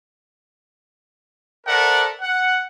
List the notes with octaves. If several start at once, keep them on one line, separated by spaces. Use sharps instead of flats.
A4 A#4 C5 D5 E5 F#5
F#5